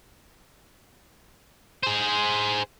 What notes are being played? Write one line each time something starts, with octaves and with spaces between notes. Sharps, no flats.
G#4 C5